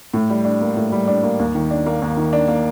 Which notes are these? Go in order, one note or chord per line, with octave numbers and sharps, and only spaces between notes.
A2
G3
D4
A#3
A2
G3
D4
A#3
D#2
D#3
D4
A#3
D#2
D#3
D4
A#3